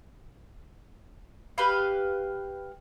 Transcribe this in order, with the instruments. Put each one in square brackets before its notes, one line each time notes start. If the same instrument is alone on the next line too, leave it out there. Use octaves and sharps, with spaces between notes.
[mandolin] G4 B4 F5